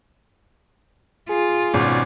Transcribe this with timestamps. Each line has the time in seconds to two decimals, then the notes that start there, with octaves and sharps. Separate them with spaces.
1.29 F4 G#4
1.74 G#1 B2 C#4 D5